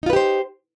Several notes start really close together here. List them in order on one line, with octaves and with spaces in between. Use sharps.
D#4 F4 B4 G4 C5